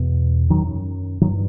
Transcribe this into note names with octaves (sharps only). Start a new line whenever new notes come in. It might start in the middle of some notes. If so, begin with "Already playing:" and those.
Already playing: E2 B2
F#2 D#3 F#3
G2 D#3 F#3